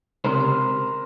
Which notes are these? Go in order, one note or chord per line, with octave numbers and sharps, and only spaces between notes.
C#2 C3 A#4 C5